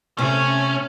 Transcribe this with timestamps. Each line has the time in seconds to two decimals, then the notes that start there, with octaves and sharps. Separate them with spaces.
0.18 C3 A3 C#4